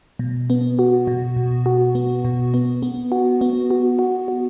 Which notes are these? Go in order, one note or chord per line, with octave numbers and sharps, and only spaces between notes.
B2
B3
F#4
B2
B2
F#4
B3
B2
B3
B3
F#4
B3
F#4
F#4
F#4